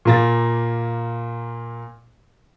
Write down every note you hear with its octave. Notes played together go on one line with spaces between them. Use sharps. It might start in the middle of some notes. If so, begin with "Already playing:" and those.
A#2 A#3 A6